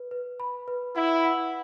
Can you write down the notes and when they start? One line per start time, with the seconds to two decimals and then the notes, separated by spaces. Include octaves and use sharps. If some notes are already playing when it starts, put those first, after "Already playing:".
Already playing: B4
0.11 B4
0.40 B5
0.68 B4
0.96 E4 F#5
1.25 F#5